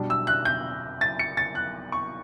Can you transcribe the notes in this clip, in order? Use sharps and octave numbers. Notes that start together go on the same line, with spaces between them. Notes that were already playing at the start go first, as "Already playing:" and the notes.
Already playing: B2 G3 D4
E6
F#6
G6
A6
C#7
A6
F#6
C#6